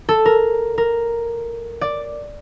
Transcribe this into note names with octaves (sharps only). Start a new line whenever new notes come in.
A4
A#4
A#4
D5